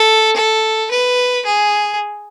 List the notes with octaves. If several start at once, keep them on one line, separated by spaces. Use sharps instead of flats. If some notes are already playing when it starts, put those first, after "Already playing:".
Already playing: A4
A4
B4
G#4